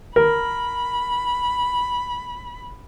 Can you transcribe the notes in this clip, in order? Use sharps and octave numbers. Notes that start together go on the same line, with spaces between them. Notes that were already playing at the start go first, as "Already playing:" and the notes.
A#4 B5